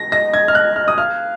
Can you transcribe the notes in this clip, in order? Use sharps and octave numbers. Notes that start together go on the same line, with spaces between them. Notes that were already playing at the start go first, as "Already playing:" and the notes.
Already playing: A#6
D#5 A#6
G#6
F6
F#6
F6
D#6
F5 F6